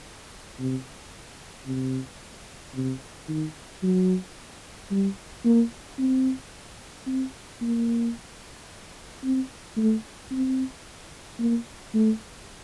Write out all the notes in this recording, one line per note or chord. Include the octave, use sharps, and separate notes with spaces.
C3
C3
C3
D#3
F#3
G3
A#3
C4
C4
A#3
C4
A3
C4
A#3
A3